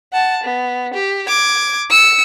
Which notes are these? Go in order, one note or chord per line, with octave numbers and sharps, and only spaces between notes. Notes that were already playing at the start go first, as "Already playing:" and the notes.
F#5 A5
B3
G4
D6 G#6
E6 C#7